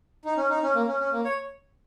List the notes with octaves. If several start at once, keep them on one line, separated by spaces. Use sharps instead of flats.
D#4
C#4
D#4
C#4
A#3
C#4
C#4
A#3
C#5